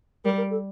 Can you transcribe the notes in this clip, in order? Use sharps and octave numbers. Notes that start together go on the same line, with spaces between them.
G3 A#4
A#4
A4